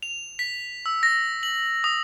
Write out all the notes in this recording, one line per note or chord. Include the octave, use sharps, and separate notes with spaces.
F7
B6
E6
A#6
F#7
D#6